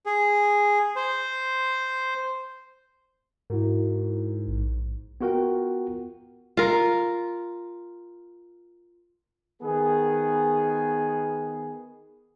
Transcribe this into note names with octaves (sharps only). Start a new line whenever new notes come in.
G#4
C5
G#2 E4 F#4 A#4
A#1
B3 F4 F#4 A#4 F#5 G5
F4 A#4
D#3 B3 G#4